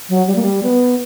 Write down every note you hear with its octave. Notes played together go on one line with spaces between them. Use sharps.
F#3
G3
A#3
G3
B3